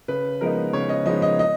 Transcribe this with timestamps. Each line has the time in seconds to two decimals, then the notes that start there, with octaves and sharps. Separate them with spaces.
0.08 C#3 B4
0.41 F3 G#3 B3 D#4 A#4
0.73 C#3 C#5
0.89 D#5
1.06 F3 G#3 B3 D#4 D#5
1.22 D#5
1.39 D#5